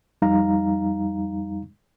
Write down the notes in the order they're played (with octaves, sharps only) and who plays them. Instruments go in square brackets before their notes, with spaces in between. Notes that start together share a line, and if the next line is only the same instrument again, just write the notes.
[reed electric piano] F2 G3 D#4 F5 A#5